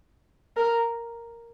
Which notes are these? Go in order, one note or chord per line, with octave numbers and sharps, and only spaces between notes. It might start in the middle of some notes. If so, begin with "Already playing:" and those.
A#4